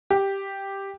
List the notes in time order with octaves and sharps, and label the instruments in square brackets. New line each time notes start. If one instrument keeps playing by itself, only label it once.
[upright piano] G4